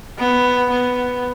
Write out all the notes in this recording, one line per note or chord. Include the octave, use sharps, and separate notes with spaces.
B3
B3